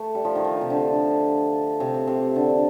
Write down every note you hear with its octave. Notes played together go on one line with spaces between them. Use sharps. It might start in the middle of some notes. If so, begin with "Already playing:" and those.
Already playing: A3
G3
F3
D#3
F3
C3
D3
C3
C3
D3